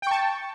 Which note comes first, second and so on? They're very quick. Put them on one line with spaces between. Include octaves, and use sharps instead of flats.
G5 C#6 A5